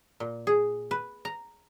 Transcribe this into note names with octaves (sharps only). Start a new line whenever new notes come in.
A#2
G#4
B4
A#5